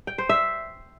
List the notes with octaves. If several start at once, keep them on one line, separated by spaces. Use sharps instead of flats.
G5
C5
E5